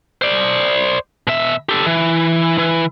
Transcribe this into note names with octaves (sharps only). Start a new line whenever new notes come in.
C5 D5
B2 E5
G4 A4
E3
E3